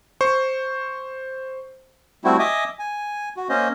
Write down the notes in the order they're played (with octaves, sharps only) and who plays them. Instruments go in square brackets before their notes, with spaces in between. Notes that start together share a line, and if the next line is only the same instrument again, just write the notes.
[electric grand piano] C5 C#6
[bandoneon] G3 A3 C4 E4 F#4
D#5 E5 G#5 D6 D#6
G#5
F#4
A#3 C#4 C5 D#5